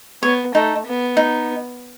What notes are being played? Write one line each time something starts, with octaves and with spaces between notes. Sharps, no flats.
B3 C#5
A3 D#4
B3
D#4